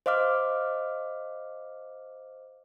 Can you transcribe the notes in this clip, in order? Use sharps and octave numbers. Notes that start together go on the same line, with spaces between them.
C5 D#5 F5 D6 F6